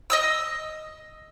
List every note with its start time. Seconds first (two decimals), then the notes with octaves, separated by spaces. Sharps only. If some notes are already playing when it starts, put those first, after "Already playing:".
0.10 D#5 D#6 E6